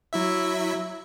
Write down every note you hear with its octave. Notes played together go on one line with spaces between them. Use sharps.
F#3 E4 E5